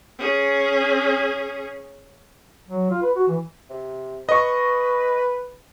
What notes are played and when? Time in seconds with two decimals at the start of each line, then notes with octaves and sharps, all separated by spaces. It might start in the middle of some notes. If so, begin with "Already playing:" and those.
0.18 C#4 G#4
2.68 F#3
2.90 F4
3.02 B4
3.15 F#4
3.27 E3
3.70 C3
4.29 B4 D#5 C#6